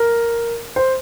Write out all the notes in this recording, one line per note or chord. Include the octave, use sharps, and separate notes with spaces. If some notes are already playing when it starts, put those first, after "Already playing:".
Already playing: A#4
C5